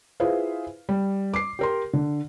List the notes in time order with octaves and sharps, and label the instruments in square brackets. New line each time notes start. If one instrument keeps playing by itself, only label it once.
[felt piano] E4 F4 G#4 B4 C5 F5
G3
D6 C7
G4 A#4 C6
D3